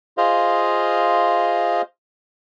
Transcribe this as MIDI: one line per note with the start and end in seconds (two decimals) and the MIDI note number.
0.18 1.82 65
0.18 1.82 68
0.18 1.82 72
0.18 1.82 75
0.18 1.82 77